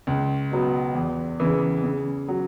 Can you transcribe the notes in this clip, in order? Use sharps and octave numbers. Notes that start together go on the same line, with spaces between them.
C#2
B2 F#3 B3
E2
C#3 E3
C#3
F#3